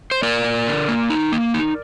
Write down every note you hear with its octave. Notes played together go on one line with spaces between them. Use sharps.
C5
A#3 A#4 D5
A#3
D3
A#3
D#4
A#3
D#4